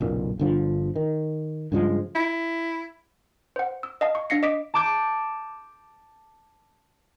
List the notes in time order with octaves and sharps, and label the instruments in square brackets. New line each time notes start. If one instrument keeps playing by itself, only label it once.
[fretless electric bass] F#1 B1 A#2
G1 D3 F3
D#3
G2 C#3 F3 G#3
[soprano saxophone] E4
[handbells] C5 F#5
E6
D#5 F5 A5
C#6
D4 F5 A#6 C7 C#7
D#5 D6 B6 D7
[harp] A5 D6 G6